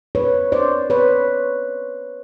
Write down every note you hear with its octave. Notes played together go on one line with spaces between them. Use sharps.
B4 C#5
C5 D5
B4 C#5